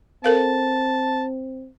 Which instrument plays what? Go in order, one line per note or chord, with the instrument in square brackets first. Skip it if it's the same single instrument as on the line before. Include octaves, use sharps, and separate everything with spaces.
[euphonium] C4 [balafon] A4 A#4 F5 [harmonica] A5